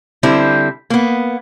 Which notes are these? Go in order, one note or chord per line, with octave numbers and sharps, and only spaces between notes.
D3 G3 C4 E4
A#3 B3